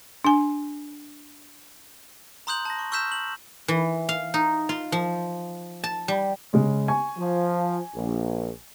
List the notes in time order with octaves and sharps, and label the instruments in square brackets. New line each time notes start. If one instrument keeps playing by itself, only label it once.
[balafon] D4 G#5
[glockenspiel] A#5 C6 D#6 F#6 G6 F#7
A5 A#6
C#6
C#6 E6 F6 G6 B6 E7
F#7
[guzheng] E3
F5
D#4
F4
F3
A5
G3
[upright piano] C#3 G#3 C#4
G#5 C#6
[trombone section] F3
A#1